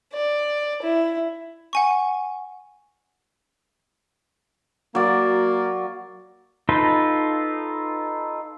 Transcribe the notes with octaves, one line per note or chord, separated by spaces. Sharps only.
D5
E4
F#5 G#5 C#6
F#3 A#3 D5
D#4 F4 A4 B4